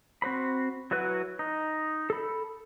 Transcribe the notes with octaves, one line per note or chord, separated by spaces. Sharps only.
C4 F#4 C5 B5
F#3 E4 F#4 B4 F#6
D#4
A4 B5